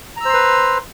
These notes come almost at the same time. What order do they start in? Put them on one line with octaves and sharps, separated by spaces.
A#5 E6 C5 C6 B4